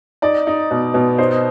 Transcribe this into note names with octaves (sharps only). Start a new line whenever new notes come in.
D#4 D5
D#4
B2
B2
D#4 C5